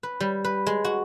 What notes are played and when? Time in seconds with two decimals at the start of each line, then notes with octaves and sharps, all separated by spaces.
0.03 B4
0.20 G3
0.45 B4
0.67 G#3
0.85 F#4